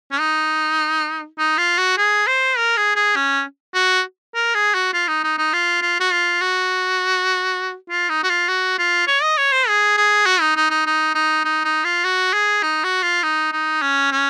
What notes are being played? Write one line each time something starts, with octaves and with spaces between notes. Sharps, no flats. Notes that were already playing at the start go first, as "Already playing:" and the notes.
C#4
D#4
D#4
F4
F#4
G#4
C5
A#4
G#4
G#4
C#4
F#4
A#4
G#4
F#4
F4
D#4
D#4
D#4
F4
F4
F#4
F4
F#4
F4
D#4
F#4
F4
F#4
F4
C#5
D#5
C#5
C5
G#4
G#4
F#4
D#4
D#4
D#4
D#4
D#4
D#4
D#4
F4
F#4
G#4
D#4
F#4
F4
D#4
D#4
C#4
C#4